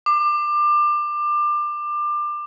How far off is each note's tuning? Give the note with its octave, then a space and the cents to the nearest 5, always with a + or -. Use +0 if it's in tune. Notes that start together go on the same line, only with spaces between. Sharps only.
D6 +25